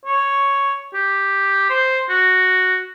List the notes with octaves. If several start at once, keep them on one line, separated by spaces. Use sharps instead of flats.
C#5
G4
C5
F#4